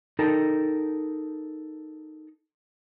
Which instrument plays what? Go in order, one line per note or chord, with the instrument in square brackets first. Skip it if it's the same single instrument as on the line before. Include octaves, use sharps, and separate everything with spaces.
[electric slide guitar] D#4 A4 A#4 G5 A5